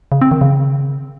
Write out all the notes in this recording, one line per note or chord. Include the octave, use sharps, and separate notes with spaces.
C#3
C4
D#3
C#3